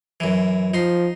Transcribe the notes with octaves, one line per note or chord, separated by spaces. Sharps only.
F#2 E3
F3 D#4 C6